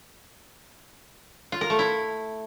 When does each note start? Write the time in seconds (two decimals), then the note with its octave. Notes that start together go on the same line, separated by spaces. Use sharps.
1.52 F4
1.61 A#4
1.70 A3
1.79 E4